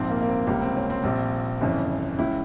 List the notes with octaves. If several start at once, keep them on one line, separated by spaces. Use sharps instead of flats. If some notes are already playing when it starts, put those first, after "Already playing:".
Already playing: A#1 G#2 F3 C4
A#3
A#3
C4
C#2 C3 G3 A#3
C4
C#4
C4
A#1 A#2 G3 C4
G1 F2 C#3 E3
C#2 C#3 E3 E4